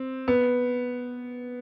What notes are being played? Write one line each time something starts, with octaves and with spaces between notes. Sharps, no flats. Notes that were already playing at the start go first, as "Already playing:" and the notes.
Already playing: C4
B3